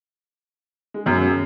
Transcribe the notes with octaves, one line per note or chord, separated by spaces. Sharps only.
G#3
F#2 F#3